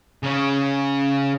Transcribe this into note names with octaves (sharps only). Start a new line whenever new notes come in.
C#3 C#4